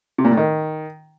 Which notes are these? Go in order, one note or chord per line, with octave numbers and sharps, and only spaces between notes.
C3
A#2
A2
D#3